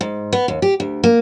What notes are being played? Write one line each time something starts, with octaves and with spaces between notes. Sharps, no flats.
G#2
B3
D#2
G4
D2
A#3